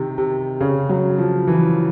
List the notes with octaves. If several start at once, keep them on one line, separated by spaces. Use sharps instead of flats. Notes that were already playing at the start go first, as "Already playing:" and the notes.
Already playing: C3 D#3
C3
C#3
F#3
F3
E3